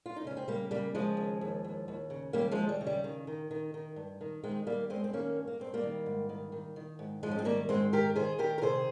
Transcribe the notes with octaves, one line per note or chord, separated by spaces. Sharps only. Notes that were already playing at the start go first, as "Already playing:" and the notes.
F4
D#4
C#3 C#4
C4
C#3 G3 A#3
C#3 G3 A#3
C#3 F3 G#3
D#2
D#2
D#2
D#2
C#3
D#2 G3 A#3
F3 G#3
D#2
G3
C#3
G3
D#3
D#3
D#3
D#3
G2
D#3
D#3 G#3 C4
D#3 G3 A#3
G2 G#3 C4
C4
D#3 A#3 C#4
G2
A#3
G2 C4
G3 A#3
D#3
G#2
D#3
D#3
D#3
G#2
G#2 F3 G#3
C#4
C4
D#3 G3 A#3
G#2 G#3 C4
D#3 G4 A#4
D#3 G#4 C5
D#3 G4 A#4
A#4
C3 G#4 C5